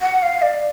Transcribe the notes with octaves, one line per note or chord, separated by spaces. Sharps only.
F#5
F5
D5